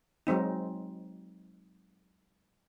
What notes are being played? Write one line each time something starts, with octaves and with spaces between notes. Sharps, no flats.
F#3 G#3 C4 D#4